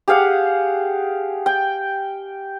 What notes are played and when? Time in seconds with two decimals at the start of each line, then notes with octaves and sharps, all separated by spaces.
0.08 G4 G#4 F5 F#5
1.46 G5